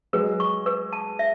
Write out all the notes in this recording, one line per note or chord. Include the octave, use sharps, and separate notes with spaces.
F#3 G#3 B4
C#6
B4
A5
E5